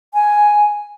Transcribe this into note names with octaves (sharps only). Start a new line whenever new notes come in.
G#5